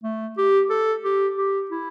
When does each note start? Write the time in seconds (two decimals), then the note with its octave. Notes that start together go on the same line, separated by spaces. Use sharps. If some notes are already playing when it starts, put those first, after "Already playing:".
0.03 A3
0.38 G4
0.70 A4
1.04 G4
1.38 G4
1.71 E4